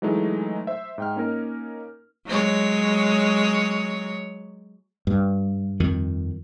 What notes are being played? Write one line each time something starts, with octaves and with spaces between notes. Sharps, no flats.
E3 F#3 G#3 A3 D#4
C5 E5
G#2 G5 F6
A#3 C#4 D#4 A#4
F#3 G#3 C#5
G2
F2 D#3